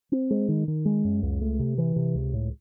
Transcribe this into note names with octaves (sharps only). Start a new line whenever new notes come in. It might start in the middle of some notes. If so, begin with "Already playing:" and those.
C4
G#3
D#3
D#3
G#3
F#2
C#2
A3
C3
E3
C3
C#2
A2